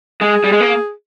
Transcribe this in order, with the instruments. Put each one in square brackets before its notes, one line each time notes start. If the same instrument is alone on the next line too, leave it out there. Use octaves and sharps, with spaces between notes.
[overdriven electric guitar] G#3 [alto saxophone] G#4
[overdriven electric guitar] G3
G#3
A#3